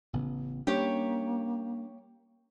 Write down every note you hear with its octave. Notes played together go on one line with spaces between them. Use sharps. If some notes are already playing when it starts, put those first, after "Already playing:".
A1 C#3 B3
G3 A#3 C#4 D4 G4 C#5